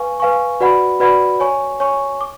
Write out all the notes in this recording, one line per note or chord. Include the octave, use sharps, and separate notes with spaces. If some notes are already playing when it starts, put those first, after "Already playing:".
Already playing: B4 F5 G#5 C#6
B4 F5 G#5 C#6
F#4 B4 D5 F#5 B5
F#4 B4 D5 F#5 B5
C#5 G#5 C#6
C#5 G#5 C#6
D6